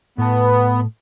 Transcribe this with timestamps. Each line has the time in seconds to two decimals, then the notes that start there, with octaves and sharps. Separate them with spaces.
0.18 A2 B3 A5